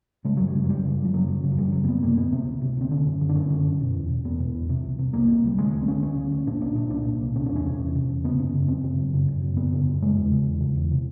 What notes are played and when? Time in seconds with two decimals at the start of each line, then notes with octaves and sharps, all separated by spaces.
0.25 C#3 G#3
0.37 F#2 F#3
0.48 G3
0.55 C#3
0.64 F#3
0.69 F#2 G3
0.84 C#3
1.00 F#2
1.05 F3
1.14 C#3 F#3
1.29 F#2
1.44 C#3
1.52 F#3
1.58 F#2 G3
1.73 C#3 F#3
1.84 A#3
1.88 F#2 B3
2.03 C3 A#3
2.17 D2 B3
2.32 C3 C4
2.47 D2
2.61 C3
2.77 D2 C4
2.91 D3 C#4
3.07 F#2
3.21 D3
3.29 D4
3.35 F#2 C#4
3.50 D3
3.66 F#2
3.81 B2
3.95 E2
4.09 B2
4.25 E2 B3
4.40 B2
4.54 E2
4.69 C3
4.84 C2
4.99 C3
5.13 C2 A#3
5.28 C3
5.42 C2 G3
5.58 D3 G#3
5.73 D2 A3
5.82 C4
5.88 D3 C#4
6.02 D2 C#4
6.17 D3
6.32 D2
6.46 A#2 D4
6.61 C2 D4
6.76 A#2 D4
6.90 C2 D4
7.06 A#2
7.21 C2
7.35 C3 C#4
7.46 D4
7.51 E2 C#4
7.65 C3
7.80 E2
7.95 C3
8.10 E2
8.24 C#3 B3
8.39 F#2 C#4
8.54 C#3
8.68 F#2 C4
8.84 C#3
8.98 F#2
9.13 C#3
9.28 F#2
9.42 C#3
9.57 F#2 B3
9.72 C#3
9.86 F#2
10.01 C#3 G#3
10.17 E2
10.32 C#3
10.46 E2
10.60 C#3
10.75 E2
10.91 C3